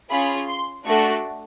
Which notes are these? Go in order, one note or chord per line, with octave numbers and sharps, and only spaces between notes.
C#4 F4 G#4 B5
C6
A3 D4 F#4 A4 C#6